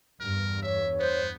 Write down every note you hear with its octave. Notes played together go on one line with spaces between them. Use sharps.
E2 G2 A#4
C#5 E5
B3 C5